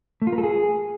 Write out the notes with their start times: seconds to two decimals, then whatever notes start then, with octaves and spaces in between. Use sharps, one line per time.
0.22 A3
0.27 F4
0.32 A#4
0.38 A4
0.43 G#4